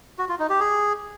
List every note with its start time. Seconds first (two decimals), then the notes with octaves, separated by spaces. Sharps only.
0.18 F#4
0.29 F4
0.39 D#4
0.49 G4
0.60 G#4